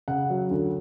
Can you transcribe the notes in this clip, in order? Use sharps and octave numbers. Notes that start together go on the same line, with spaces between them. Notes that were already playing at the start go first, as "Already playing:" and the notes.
C#3 F#5
F#3
D2